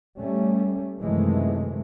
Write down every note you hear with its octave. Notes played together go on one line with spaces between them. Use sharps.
G3 A3 C#4
F#2 C3 D#3 E3 G#3 A3